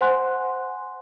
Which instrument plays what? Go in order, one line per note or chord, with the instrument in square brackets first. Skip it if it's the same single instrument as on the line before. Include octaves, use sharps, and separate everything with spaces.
[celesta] C5 F#5 G#5 C6 F#6